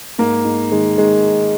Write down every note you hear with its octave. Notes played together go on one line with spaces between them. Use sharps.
G#2 A#3
G#2
D#3 G#3
D#3 G#3